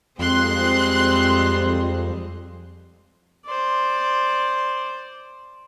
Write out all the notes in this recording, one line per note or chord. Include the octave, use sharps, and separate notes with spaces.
F2 G3 G#3 C4 C6 F#6
C5 D5